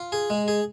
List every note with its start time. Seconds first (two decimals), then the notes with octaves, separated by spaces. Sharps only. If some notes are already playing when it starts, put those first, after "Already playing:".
Already playing: F4
0.12 G#4
0.30 G#3
0.48 G#4